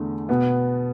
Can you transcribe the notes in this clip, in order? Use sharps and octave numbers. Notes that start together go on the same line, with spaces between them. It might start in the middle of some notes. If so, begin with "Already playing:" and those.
Already playing: E2 D3 A3
B2 B3